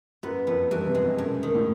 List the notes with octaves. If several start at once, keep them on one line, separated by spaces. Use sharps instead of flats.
F#2 B3
F2 B3
G2 E3
C3
G#3
B2
F#2
D#3
A2